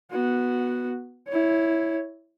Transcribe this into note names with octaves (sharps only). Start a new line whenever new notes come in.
B3 F#4
E4 C#5